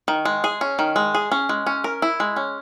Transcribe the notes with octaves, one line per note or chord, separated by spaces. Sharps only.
D#3
G#3
G#4
C#4
D#3
G#3
G#4
C#4
G#3
C#4
A#4
E4
G#3
C#4